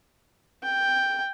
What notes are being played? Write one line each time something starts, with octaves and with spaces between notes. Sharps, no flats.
G5